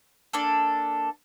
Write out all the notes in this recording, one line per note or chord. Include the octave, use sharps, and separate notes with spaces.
A#3 D4 A4